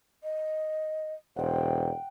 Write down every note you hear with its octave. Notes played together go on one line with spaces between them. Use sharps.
D#5
E1 C5 F#5 G5